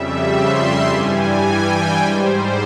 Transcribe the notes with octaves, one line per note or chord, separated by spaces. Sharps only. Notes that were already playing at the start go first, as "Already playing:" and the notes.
Already playing: F2 C#3 G3 E5
C6
G2 E3 G3 G#5
G5
G#2 G3 C5